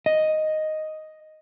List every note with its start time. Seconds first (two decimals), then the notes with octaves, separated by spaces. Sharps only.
0.06 D#5